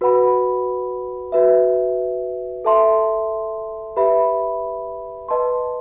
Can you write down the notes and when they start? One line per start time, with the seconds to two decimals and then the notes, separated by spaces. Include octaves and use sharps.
0.01 F#4 B4 F#5 B5
1.32 F#4 B4 E5
2.65 A4 E5 A5 C6
3.96 G4 B4 E5 B5
5.28 B4 D#5 A5 C6